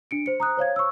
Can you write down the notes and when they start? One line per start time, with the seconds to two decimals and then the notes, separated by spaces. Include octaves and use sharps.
0.11 D4 C#7 D7
0.26 C5 C#7
0.40 A#5 D#6 F#6
0.57 C5 C#5 F5 G#6
0.76 C#6 E6